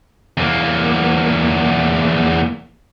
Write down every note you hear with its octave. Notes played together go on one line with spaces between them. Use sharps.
E2 A#3